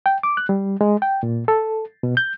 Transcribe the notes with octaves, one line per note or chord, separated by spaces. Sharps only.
G5
D6
F#6
G3
G#3
G5
A#2
A4
B2
G6